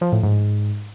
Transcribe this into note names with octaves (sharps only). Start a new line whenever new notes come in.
F3
A2
G#2